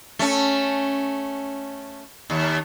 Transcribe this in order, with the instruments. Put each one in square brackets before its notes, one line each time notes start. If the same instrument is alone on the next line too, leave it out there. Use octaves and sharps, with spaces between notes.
[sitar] A3 C#4
D#2